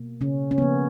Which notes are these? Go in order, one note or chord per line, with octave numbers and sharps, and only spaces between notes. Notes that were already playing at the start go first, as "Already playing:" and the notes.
Already playing: B2 A#3
C#3 C#4
C#4
C#3 F3 A#3 B3